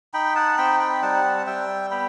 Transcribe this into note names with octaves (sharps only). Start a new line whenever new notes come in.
D#4 G5 B5
F#5 A5
C4 G5 B5
G5 B5
G3 F#5 A5
G3 E5 G5
B3 G5 B5